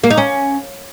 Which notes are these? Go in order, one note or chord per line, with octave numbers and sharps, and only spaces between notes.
A#3
D#4
C#4